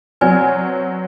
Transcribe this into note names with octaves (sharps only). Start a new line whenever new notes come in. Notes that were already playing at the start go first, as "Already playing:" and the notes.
F#3 C4 B4 D5 G#5